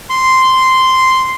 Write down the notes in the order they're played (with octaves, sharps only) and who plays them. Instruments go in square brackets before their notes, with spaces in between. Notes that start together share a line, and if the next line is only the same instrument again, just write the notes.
[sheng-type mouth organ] C6